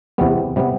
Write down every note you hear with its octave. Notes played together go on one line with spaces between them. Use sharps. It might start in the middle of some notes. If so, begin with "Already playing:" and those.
E2 C3 G3 B3
C3 G3 B3